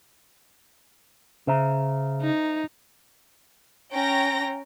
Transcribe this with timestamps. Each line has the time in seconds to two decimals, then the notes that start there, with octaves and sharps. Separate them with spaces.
1.47 C#3 C5 E5 A#5
2.22 D#4
3.92 C#4 G5 A#5 A#6